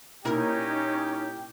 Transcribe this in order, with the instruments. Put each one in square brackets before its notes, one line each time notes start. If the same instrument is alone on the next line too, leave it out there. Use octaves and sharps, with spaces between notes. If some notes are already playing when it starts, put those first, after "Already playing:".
[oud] A#2 E4 A#4 [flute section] C#4 D#4 [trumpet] G4